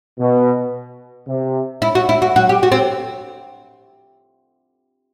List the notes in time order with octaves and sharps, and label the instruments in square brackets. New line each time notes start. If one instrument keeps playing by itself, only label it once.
[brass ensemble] B2
C3
[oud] E4
F#4
E4
F#4
[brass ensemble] F#3 [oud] F#4
[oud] G4
F#4
C4